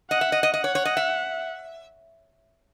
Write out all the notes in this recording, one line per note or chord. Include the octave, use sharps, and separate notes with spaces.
D#5 F#5
E5
D#5
D#5
D#5 F#5
C#5
C#5
D#5
E5